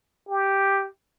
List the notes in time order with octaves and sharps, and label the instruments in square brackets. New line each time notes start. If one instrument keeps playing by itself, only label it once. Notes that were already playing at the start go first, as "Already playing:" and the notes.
[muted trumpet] G4